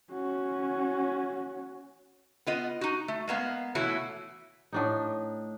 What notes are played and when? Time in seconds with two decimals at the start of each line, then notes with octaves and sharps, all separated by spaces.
0.12 C#4 F#4
2.47 B3 F4 D#5
2.81 D#4 F#4
3.08 A3
3.28 G#3 A#3 B3 F5
3.75 B2 E3 A3 E4 F#4 C#5
4.72 A2 D4 D#4